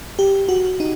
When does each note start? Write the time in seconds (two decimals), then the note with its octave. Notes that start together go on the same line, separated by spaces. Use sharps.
0.19 G4
0.49 F#4
0.80 D#4